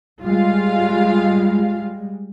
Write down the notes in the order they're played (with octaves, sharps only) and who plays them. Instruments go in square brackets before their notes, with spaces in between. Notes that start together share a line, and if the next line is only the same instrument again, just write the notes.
[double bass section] G3 G#3 [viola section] F4 F5